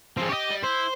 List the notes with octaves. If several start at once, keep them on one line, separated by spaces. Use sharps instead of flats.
F2 F3 C4 G#4
G4 C#5 D#5
G3
E4 C5